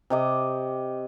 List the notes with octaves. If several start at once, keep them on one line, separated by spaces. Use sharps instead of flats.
C3 D#5 D6